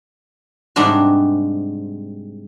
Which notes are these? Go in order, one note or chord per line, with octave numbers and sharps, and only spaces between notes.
G#2 C3 G3 G#3 D4 F#4